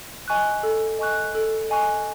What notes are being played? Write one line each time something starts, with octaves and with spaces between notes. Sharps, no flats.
D#5 G#5 C#6 F#6
A4
D#5 G#5 C#6 F#6
A4
D#5 G#5 C#6 F#6